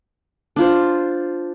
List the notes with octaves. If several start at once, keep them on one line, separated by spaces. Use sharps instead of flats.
D4 F4 C5